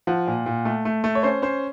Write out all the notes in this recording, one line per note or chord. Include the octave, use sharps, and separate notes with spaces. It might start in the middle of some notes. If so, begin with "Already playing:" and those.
F3 F#5
A#2
A#2
A3
A3
A3
C#5
C#4 C5
C#4 C5